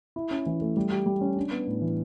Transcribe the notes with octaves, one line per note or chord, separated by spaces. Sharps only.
E4
C#4
E3
A3
G3
G4
G3
C#4
D4
B3
A2
E3